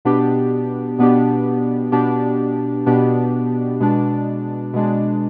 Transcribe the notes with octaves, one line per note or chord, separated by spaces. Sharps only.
B2 B3 D4 G4
B2 B3 D4 G4
B2 B3 D4 G4
B2 B3 D4 G4
B2 G#3 D4
B2 G#3 D4